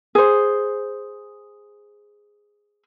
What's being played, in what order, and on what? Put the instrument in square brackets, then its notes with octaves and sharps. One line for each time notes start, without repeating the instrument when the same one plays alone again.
[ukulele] G#4 C5